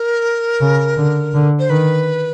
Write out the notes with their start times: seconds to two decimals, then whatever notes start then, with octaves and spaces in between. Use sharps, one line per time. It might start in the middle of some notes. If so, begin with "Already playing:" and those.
Already playing: A#4
0.61 C#3
0.97 D3
1.34 D3
1.59 C5
1.70 D#3 B4